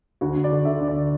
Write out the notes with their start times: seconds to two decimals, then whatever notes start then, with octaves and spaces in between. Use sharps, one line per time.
0.21 D2 F#4
0.36 D2
0.44 D5
0.52 D3
0.65 D3 E5
0.80 D2
0.88 D5